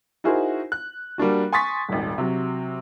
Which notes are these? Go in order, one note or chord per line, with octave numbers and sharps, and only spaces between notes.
D#4 E4 F#4 G#4 A#4 C5
F#6
G3 A#3 D4 F#4
G#5 C6 C#6 D#6 A6 B6
D#1 G#1
C3 F#3